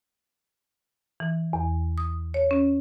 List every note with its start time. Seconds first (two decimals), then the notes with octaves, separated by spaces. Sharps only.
1.20 E3
1.53 E2
1.98 D#6
2.34 C#5
2.51 C#4